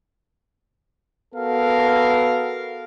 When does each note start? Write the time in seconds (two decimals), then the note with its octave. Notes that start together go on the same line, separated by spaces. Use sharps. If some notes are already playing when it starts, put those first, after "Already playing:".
1.34 B3 F#4 A4 A#4 F5